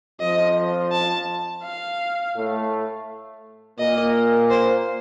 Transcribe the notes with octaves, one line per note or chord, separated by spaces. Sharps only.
F2 F3 D#5
A5
F5
A2 A3
A#2 A#3 D#5
C5